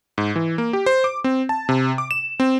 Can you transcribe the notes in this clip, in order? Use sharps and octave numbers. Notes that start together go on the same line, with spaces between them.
G#2
E3
A#3
G4
C5
D6
C4
A5
C3
D6
E7
C4